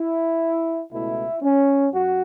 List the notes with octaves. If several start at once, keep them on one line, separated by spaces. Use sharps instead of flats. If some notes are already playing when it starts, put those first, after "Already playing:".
Already playing: E4
C#2 B2 A3 E4
C#4
F#2 F#4